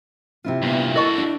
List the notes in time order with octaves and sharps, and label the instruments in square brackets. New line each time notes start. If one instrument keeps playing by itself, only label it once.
[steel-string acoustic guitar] C3 E4 F4 [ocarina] C4
[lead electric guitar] G2 A#2 [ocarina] B3
[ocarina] E4 [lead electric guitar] F#4 A4 [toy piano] A#4 D#5 C#6
[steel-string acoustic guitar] D4